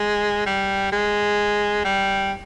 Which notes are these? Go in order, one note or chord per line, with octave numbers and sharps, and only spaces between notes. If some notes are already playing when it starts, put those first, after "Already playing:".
Already playing: G#3
G3
G#3
G3